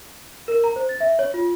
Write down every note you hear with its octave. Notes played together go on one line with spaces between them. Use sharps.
A#4
A#5
C5
A6
E5
C#5
F4